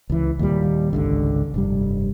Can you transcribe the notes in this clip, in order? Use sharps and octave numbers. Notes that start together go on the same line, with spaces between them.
C#2 E3
D#2 A#2 G3
G#1 C#2 D3
F1 G2 G3